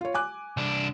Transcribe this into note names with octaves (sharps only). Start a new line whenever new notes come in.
F4 C#5
G#5 D6 F#6
C2 D4